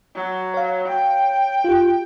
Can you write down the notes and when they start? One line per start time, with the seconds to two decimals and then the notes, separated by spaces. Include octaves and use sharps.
0.15 F#3
0.54 C#5 F5
0.88 G5
1.64 F4 G4